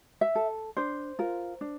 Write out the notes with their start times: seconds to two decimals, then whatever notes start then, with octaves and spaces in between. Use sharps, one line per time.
0.21 E5
0.35 A4
0.77 D4 C5
1.19 F4 A#4
1.61 D4